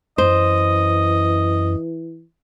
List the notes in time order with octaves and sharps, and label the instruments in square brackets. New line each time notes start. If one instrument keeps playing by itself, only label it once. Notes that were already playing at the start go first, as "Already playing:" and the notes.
[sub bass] F#2 [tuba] E3 [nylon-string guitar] C5 [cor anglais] D#5